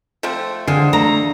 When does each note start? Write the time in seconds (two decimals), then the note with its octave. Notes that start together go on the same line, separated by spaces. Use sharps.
0.23 F3 A3 C4
0.68 D3 G#3 C4 D4 F4
0.93 A3 A#5